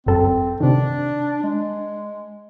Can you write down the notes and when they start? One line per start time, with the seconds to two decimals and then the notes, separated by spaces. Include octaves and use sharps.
0.06 G1 F#2 C4 A4
0.60 C3 D#3 D4
1.43 G#3